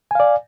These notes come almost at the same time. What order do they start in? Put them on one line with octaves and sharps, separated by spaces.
G#5 F5 D5